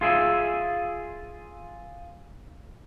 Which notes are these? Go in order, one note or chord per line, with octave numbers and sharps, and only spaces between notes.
F4 G#4 E5